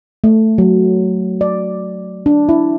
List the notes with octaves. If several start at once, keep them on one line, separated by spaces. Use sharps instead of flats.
A3
F#3
D5
D4
E4